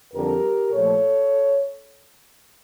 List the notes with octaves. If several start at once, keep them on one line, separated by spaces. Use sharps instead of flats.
F2 D3 G3 G4 A#4
A#2 F3 A3 A4 C#5